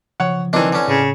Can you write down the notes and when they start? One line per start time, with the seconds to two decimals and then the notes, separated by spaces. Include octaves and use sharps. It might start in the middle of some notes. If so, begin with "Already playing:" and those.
0.20 C#3 F3 C#5 F#5
0.53 D#3 E3 C4 D4
0.73 D3 C#4
0.88 A2 C#3